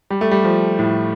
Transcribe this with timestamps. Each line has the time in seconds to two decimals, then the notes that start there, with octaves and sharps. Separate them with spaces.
0.10 G3
0.21 A3
0.31 G3
0.44 F3
0.79 A2